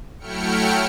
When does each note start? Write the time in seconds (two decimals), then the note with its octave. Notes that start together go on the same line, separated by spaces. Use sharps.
0.19 F#3 A3 E4 G5 F6 C#7